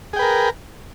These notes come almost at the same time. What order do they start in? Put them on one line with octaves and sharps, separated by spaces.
G#4 G5 B4 A#4